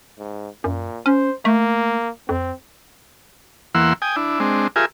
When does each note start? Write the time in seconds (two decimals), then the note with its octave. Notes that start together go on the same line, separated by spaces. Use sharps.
0.18 G#2
0.64 F#2 A#2
1.06 C#4 C5
1.45 A3 A#3
2.29 F2 C4
3.75 E2 E3 A#3 F#5 C6 E6
4.02 G5 G#5 D#6
4.16 D4 E4
4.40 G#3 C4 D4
4.76 F4 G4 G#4 A#4 E5 G#5